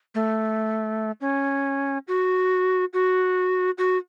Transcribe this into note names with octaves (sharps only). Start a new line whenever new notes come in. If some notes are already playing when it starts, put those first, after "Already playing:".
A3
C#4
F#4
F#4
F#4